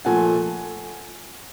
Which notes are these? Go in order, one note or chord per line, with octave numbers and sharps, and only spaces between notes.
A#2 F3 A3 F#5 G#5